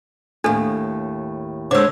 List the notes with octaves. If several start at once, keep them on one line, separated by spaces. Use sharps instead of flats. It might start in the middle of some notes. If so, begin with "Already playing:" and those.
D#2 A2 D4 A4
D3 G#3 C5 C#5 D6 E6